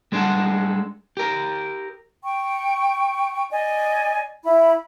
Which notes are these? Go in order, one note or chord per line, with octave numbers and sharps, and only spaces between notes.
G3 G#3 D4 G#4 A4 F#5
G4 A#4
G5 C#6
D5 D#5 G#5
E4 B5